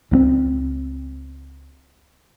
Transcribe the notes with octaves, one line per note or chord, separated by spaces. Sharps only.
C#2 A3 C4